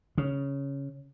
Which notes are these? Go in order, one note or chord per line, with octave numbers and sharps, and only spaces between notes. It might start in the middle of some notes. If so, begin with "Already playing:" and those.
C#3